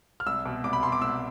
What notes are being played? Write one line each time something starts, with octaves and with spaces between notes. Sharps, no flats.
F6
C2 E6
B2
C2 D6
B5
B2 C6
D6
C2 E6